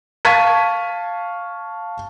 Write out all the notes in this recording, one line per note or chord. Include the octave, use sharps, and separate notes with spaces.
F5 A5 C#6 G#6 B6 D#7